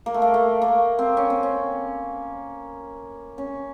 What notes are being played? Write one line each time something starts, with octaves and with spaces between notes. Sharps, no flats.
A#3
A3
A#3
A3
A#3
C4
C#4
C4
C#4
C#4